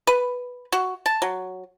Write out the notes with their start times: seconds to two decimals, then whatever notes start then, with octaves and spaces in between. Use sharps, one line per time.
0.07 B4
0.72 F#4
1.06 A5
1.22 F#3